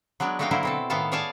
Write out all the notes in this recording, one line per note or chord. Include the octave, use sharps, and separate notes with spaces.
F#3 G#3 B3 D4
A3 A#3 D#4 F#4 F5 G5
D3 F#3 A#3 E4 C5
B2 C4 A4
A2 D#3 B3 A4 F5 A5
G#4 C#5 D5 F5 G#5 A5